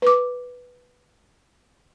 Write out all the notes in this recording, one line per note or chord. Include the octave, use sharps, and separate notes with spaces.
B4 D6